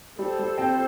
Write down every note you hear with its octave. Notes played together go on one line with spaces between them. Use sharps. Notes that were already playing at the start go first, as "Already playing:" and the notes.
G3 A4 C5
G3
C4